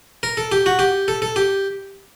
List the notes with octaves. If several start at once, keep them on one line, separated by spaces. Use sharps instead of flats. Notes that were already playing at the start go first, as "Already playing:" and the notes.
A#4
A4
G4
F#4
G4
A4
A4
G4